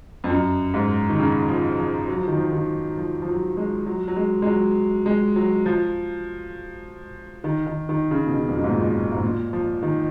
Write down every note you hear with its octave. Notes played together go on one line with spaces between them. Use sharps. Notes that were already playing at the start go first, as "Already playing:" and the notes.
F2
F#2
G#2
D#3
C#3
F3
F3
F#3
F3
D#3
F3
D#3
F3
F3
F#3
G#3
F#3
F#3
G#3
G#3
F#3
G#3
F#3
F3
D#3
D#3
D#3
C#3
B2
C#3
F2
F#2
G#2
A#2
B2
G#2
A#2
F3
D#3